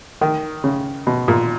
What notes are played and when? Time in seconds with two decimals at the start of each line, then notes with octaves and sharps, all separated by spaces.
0.21 D#3
0.64 C#3
1.07 B2
1.28 A#2